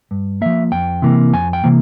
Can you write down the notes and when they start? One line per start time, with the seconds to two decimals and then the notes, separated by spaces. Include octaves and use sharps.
0.11 G2
0.41 F3 A#3 E5
0.72 F2 G5
1.02 C3 E3 A#3
1.33 F2 G#5
1.53 G5
1.64 C3 E3 A#3